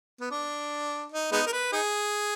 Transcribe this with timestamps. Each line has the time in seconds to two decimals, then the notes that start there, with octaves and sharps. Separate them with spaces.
0.21 B3
0.31 D4
1.12 D#4
1.32 G#3 B3 D#4
1.47 A#4
1.53 B4
1.73 D#4 G#4